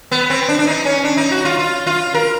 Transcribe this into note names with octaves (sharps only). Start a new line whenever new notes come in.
B3
C4
D4
D4
D#4
C#4
D4
D#4
F#4
F4
F4
F4
A#4